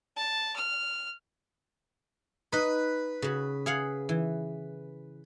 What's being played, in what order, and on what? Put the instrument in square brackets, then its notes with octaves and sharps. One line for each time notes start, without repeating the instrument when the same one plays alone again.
[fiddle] A5
F6
[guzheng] D#4 D#5 [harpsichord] B4
[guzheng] C#3 F#4
G#4 F5 F#5
E3